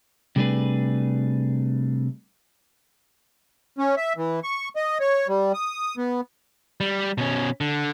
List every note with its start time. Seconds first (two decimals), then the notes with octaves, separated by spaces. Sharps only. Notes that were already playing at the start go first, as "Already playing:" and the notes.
0.36 C3 G3 A3 D4 G#4 B4
3.78 C#4
3.97 E5
4.17 E3
4.44 C#6
4.76 D#5
5.00 C#5
5.28 G3
5.54 D#6
5.97 B3
6.80 G3
7.18 B2 C#4
7.61 D3